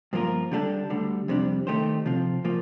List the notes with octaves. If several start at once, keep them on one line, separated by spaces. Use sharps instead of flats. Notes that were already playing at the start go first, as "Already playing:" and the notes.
G2 F3 A#3 F4 A#4
D3 G3 D4 A4
D2 D3 G3
F2 C3 G3 D4
D#3 A3 D#4 G4 C5
C3 F3 C4 F4
A#2 F3 A#3 F4